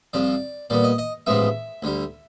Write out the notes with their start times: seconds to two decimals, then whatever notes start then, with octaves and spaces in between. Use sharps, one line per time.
0.13 C2 C3 F3 D5
0.70 A#2 G3 B3 D5
0.84 D#5
0.98 D#5
1.27 A1 G#2 F3 G#3 B3 E5
1.83 D2 D3 G3